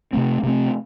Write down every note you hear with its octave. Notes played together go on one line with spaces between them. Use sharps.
C3 A3 C4
C3 A3 C4